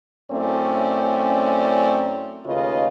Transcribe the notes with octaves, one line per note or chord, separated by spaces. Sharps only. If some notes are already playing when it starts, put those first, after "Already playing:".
F#2 A3 C4 C#4 E4 D5
D#2 C#3 A3 F4 B4 D#5